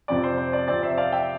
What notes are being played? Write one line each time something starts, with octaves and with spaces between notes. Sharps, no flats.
F2 C3 F3 C4 D5
C5
C5
D5
F2 C3 F3 C4 D5
C5 E5
D5 F5
E5 G5